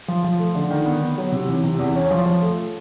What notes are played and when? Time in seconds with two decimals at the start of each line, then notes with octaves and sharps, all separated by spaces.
0.08 F3
0.24 F3
0.39 A3
0.55 D3
0.70 D#3
0.86 B3
1.01 B3
1.18 F#3
1.32 C3
1.48 E3
1.64 C3
1.79 E2
1.95 C#4
2.11 F3
2.26 F3
2.42 A3